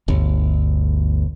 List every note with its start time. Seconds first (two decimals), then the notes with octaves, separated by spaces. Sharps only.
0.08 G1 D2